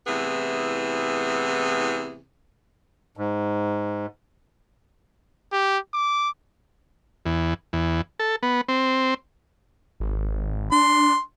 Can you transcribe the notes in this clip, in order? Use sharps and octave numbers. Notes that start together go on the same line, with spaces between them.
A2 C3 E3 B3 G#4
G#2
G4
D6
E2
E2
A4
B3
C4
G#1
D4 C6